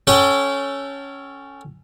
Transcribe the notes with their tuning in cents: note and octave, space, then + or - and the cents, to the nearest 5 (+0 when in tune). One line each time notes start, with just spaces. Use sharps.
C#4 +0 A4 +5 G5 -35